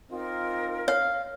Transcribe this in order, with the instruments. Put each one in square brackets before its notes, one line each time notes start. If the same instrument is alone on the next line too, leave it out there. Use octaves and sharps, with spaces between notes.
[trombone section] C4 D#4 F4 [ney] A#4
[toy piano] C#5 [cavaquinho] F5